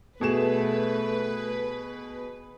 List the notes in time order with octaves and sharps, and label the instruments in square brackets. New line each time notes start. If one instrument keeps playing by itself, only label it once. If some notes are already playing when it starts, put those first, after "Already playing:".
[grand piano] B2 G#4 E7 [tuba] A3 [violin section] B4